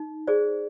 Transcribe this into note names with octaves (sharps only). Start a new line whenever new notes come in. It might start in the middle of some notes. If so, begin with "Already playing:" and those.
Already playing: D#4
G#4 C5 D5